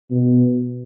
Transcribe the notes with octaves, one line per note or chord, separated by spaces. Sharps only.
B2